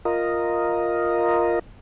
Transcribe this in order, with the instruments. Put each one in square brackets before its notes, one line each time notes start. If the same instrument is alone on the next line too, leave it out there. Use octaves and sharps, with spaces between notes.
[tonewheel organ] F4 A#4 D#5